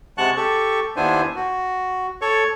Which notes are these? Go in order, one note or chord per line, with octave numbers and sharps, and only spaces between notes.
C3 G#3 F#5 A5 C#6 F#6
G4 A4 C#6
D#2 B3 D4 E4 C5 G#5
F#4
A4 C#5 C#6